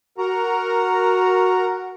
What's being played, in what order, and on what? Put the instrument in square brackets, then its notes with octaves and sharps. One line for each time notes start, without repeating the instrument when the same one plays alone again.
[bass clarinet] F#4 [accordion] A#4 F#5 A#5